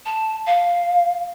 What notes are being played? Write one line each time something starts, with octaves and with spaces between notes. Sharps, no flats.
A5
F5